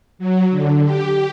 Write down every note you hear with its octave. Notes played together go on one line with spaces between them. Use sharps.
F#3
D3
G4